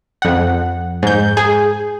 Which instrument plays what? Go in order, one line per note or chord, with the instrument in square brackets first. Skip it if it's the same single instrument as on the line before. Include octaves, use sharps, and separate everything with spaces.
[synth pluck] F2 F#5
G#2 G6
G#4